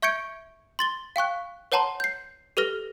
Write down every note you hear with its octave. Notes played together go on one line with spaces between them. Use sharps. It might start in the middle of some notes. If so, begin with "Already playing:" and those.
E5 C#6 G6 G#6 C#7 D7
C6 A6 G7
F5 G5 C#6 F#6
B4 C#5 F#5 A5 A#5 C6
G6 C7
G4 A4 B4 F6 A#6